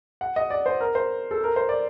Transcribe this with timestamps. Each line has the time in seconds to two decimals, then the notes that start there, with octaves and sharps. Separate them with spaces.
0.21 F#5
0.36 D#5
0.50 D5
0.66 C5
0.81 A#4
0.95 C5
1.31 A4
1.44 A#4
1.56 C5
1.69 D5